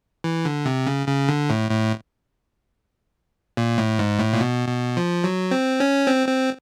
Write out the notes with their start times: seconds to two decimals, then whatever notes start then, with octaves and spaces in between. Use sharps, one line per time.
0.24 E3
0.45 D3
0.65 C3
0.87 C#3
1.07 C#3
1.29 D3
1.50 A2
1.71 A2
3.57 A#2
3.78 A2
3.99 G#2
4.19 A2
4.33 A#2
4.41 B2
4.68 B2
4.97 F3
5.24 F#3
5.51 C4
5.80 C#4
6.07 C4
6.28 C4